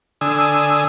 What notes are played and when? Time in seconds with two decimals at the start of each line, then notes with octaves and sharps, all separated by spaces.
0.21 D3 G#5 D#6 E6